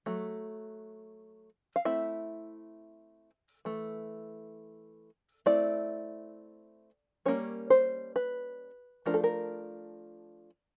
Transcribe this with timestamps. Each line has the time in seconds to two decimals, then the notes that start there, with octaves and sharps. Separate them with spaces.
0.06 F#3 A3
1.76 F5
1.85 A3 C4 E4 E5
3.65 E3 A3
5.46 A3 C4 E4 D5
7.26 G3 A#3 C#4 C#5
7.70 C5
8.16 B4
9.06 F3 A3 D4 F4 A#4
9.14 A4
9.24 A#4